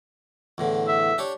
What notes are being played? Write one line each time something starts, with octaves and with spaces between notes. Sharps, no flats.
E2 A2 D3
E5
D4 G4 C#5